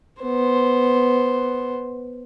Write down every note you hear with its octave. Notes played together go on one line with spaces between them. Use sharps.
B3 C5